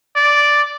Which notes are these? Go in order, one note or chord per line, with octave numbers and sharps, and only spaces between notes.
D5